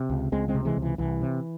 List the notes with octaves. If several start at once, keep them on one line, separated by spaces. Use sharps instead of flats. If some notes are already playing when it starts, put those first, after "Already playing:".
Already playing: C3
C#2
C#2 G#3 C4
G#3 C4
C3
E3 G#3
C#2
E3
C2 E3
C3